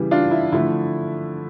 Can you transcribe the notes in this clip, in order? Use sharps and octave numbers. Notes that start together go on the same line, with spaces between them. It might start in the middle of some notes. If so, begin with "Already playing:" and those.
Already playing: C#3 E3 G3
D4 F4
E4
D3 F3 A3 E4